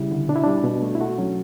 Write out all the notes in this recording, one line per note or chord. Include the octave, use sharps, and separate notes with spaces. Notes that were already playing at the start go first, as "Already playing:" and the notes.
Already playing: C#3 G3 E4
D3
B2 D4
E4
G3 D4
B2
A3
E4
A3 F#4
F#3 C#4